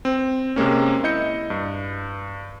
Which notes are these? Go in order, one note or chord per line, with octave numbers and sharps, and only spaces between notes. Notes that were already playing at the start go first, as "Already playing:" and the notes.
C4
C3 G#3 A#3 C#4
E4 D#5 G6 C#7
G2